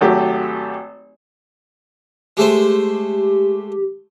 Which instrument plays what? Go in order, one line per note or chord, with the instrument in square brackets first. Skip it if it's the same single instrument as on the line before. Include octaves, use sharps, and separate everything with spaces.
[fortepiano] G#1 F#3 A3 G4
[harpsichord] G#3 A3 C5 [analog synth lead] G4